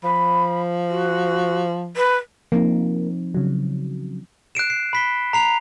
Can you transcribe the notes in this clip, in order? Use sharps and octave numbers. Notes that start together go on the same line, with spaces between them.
F3 B5
F#4
B4
F3 A#3 C4 D#4
C#3 F#3
F#6 C7 D7 E7
C7
B5 B6 G7
A#5 C7 F7